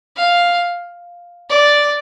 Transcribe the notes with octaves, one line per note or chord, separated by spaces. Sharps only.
F5
D5